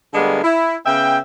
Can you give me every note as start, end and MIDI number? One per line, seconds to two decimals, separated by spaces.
0.14 0.40 50
0.14 0.40 55
0.14 0.40 56
0.14 0.40 58
0.14 0.40 59
0.44 0.76 64
0.86 1.20 49
0.86 1.20 59
0.86 1.20 76
0.86 1.20 79